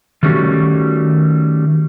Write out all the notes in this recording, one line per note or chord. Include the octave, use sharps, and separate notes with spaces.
D#3 G3 A3 C#4 F#4 G4